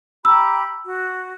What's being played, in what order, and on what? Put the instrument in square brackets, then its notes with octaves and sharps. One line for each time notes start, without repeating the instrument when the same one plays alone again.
[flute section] G4 A#5 B5 [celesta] E6
[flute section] F#4